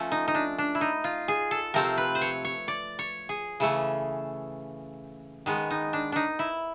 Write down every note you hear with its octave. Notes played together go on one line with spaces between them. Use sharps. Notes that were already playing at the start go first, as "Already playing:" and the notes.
Already playing: F3 A3 C#4
D#4
D#4
D4
D4
E4
D#4
F4
G#4
A4
C3 F3 A3 C4 A#4
B4
C5
C#5
C#5
D5
C#5
G#4
C#3 E3 A3 C#4
D#3 G#3 B3
D#4
D4
D4 D#4
E4